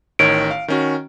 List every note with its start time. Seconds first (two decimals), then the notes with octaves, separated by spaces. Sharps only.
0.19 A1 D#3 C#5 D7
0.51 F5
0.68 D#3 C#4 F#4